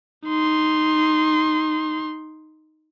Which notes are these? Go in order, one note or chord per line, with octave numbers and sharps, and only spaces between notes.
D#4 C6